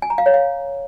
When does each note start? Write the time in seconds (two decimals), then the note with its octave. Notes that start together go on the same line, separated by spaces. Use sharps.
0.02 G#5
0.10 A#5
0.18 F5
0.26 C#5
0.34 F5